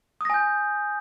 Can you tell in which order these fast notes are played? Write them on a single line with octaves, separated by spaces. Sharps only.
D#6 A#6 G#5 G6